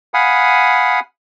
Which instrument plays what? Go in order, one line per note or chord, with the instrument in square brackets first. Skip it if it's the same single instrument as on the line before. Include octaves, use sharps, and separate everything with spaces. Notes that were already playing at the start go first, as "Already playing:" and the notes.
[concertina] F5 F#5 G#5 B5 D#6